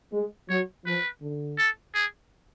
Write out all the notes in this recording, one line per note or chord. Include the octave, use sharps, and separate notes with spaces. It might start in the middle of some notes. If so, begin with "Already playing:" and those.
G#3
F#3 C#5
F3 B4
D3
A4
G#4